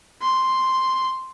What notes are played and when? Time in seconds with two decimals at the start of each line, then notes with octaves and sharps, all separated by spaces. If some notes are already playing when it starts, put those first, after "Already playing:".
0.22 C6